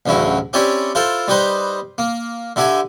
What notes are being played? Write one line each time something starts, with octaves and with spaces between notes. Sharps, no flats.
A1 D2 C#3 F#3 E4
C4 C#4 E4 G4 C#5 D5
E4 F4 A4 C5
G3 D#4 G4 B4 C5
A#3
D3 E4 G4 E5 G#5